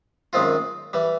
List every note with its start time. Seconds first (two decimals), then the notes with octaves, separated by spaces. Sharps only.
0.33 F#2 D#3 G#3 C4 F4
0.93 E3 G3